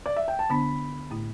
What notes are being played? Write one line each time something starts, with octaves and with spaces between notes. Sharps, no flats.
D5
E5
G5
A5
D3 B3 D4 B5
A2 A3 E4